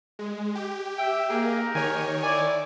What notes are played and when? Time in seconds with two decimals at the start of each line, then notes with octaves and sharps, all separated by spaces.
0.19 G#3
0.55 G4
0.98 E5 G5
1.30 A#3 D#4 G4 G#4 A#4
1.75 D#3 C#5 G#5
2.23 E4 D5 G#5